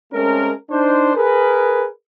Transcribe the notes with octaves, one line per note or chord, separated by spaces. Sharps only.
G#3 A3 C4 C#4 A#4
D4 D#4 C5
G#4 A#4 B4